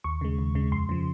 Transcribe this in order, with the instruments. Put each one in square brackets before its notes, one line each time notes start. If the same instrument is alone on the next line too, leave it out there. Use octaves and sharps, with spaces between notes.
[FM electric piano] D#2 C#6
C#3 G#3
D#2
C#3 G#3
F2 C6
C#3 F3